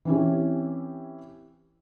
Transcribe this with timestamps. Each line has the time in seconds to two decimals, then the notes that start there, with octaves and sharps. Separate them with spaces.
0.05 E3 C4 C#4 E4 G4